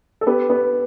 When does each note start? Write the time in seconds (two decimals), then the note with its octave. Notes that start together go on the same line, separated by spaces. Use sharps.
0.21 A4
0.26 B3 G4
0.50 B3